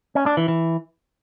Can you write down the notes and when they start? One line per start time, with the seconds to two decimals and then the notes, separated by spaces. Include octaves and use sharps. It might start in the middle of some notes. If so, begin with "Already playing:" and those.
0.15 C#4
0.26 D4
0.37 E3
0.48 E3